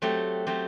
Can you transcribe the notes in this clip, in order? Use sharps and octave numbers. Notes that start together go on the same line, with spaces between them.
F#3 A3 C4 G4
F#3 A3 C4 G4